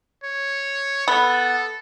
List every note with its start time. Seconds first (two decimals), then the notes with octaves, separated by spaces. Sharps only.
0.24 C#5
1.08 B3 A4